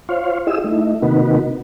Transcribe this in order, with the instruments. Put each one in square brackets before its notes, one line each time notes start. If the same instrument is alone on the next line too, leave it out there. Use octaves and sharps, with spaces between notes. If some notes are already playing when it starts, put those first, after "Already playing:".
[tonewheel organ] F4 C5 C#5 F5
E4 F4 G4 G#4 D#5 E6
A3 D#4 E4
C3 D#3 A#3 D#4 F#4 B4